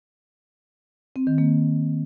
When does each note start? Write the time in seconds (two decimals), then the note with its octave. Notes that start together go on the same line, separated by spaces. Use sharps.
1.16 C4
1.27 D#3
1.38 A#3